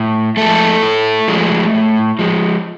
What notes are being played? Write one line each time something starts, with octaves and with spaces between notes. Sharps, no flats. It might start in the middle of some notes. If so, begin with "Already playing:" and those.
Already playing: A2
F3 G#3 A3 A4
A2
F3 G#3
A2
F3 G#3